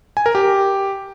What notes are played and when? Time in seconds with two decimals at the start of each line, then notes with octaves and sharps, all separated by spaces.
0.17 G#5
0.26 A#4
0.35 G4